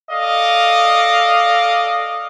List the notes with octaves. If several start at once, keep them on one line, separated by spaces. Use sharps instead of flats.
A4 D5 D#5 F5